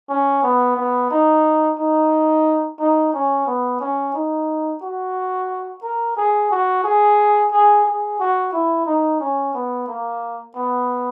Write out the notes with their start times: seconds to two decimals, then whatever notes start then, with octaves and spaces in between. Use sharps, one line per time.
0.09 C#4
0.43 B3
0.76 B3
1.11 D#4
1.78 D#4
2.79 D#4
3.13 C#4
3.46 B3
3.80 C#4
4.14 D#4
4.82 F#4
5.83 A#4
6.17 G#4
6.51 F#4
6.84 G#4
7.52 G#4
7.85 G#4
8.20 F#4
8.53 E4
8.86 D#4
9.20 C#4
9.54 B3
9.88 A#3
10.56 B3